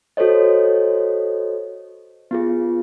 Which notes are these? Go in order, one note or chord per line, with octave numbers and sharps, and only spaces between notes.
F#4 A4 C5 C#5 D#5
B3 F4 G#4